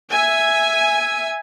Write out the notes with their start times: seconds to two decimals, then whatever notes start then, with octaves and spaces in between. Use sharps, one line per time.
0.11 E5 G#5